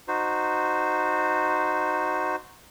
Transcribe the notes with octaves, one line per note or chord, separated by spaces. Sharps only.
D#4 F#4 C5